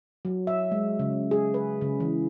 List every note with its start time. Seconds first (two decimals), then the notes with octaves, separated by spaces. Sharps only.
0.25 F#3
0.47 E5
0.72 G#3
0.99 C#3
1.31 G#4
1.54 B4
1.81 C#3
2.00 E3